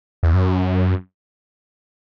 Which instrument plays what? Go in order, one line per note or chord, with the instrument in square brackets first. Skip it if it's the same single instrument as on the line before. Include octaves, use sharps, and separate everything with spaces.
[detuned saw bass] E2
F#2